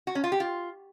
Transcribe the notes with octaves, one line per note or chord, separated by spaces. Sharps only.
F#4
C#4
F4
G4
F4